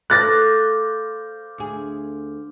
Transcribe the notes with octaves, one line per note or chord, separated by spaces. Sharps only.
A3 C5 F5 D6 F#6 A6 A#6
D2 G#4